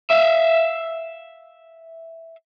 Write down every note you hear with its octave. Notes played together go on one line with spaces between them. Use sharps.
E5 F5